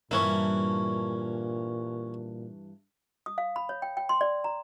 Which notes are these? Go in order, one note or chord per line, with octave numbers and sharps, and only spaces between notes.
G2 A#2 E3 A#3 C#4 E4 C#5
D#6
F5
B5
C#5
G5
G5
C6
D5
A#5